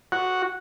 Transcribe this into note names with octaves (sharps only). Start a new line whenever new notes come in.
F#4